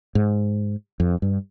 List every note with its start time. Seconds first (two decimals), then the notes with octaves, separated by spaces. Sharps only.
0.15 G#2
1.00 F2
1.22 G2